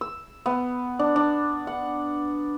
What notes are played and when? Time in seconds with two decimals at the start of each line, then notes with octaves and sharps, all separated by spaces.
0.01 E6
0.46 B3
0.99 D4
1.16 D4
1.67 F#5